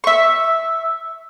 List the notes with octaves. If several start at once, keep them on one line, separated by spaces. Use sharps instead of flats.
E5 C#6